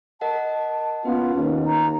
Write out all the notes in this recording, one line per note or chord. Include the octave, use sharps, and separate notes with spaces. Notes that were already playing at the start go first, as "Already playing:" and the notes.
A#4 D#5 F#5 A5
A#3 B3 C#4 F4 B4
D#2
A#5